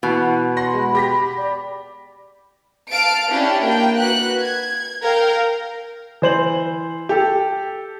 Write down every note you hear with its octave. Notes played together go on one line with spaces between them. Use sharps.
B2 E3 F#5
F#5 B5 C6 A#6
G#3
G4 A#6 B6
D5
F5 A5 D7
C#4 D4 E4 G4
A#3 G5
F#4 B4 F#6
G#6
A#4 F5 G5
E3 C5 F#7
G4 A4